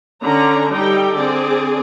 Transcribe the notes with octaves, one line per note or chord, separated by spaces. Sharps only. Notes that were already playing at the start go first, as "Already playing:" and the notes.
D3 C#4 A#5
G3 D#4 G4 A4 G5
D3 C4 G#4 D5